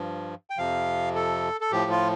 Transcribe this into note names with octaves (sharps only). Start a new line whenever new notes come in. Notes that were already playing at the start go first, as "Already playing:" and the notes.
Already playing: G2 F3
G5
F2 C3 F3 F5
A4
A4
A2 F3 G4
F4